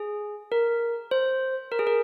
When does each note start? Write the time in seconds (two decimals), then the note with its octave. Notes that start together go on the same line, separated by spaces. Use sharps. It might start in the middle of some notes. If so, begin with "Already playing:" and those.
Already playing: G#4
0.52 A#4
1.11 C5
1.72 A#4
1.79 G#4
1.87 A#4